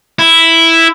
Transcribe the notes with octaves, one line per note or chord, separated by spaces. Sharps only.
E4